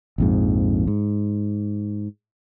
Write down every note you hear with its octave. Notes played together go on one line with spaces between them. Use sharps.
A#1 F2 G#2
G#2